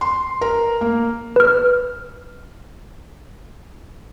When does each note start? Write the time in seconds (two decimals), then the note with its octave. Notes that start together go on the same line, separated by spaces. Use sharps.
0.01 C6
0.41 A#4
0.81 A#3
1.36 B4 F6